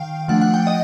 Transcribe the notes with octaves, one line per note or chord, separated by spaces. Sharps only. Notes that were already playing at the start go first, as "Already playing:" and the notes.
Already playing: D#3 F5 G5
F3 A3 D4 F#5
F#5
G5
D#5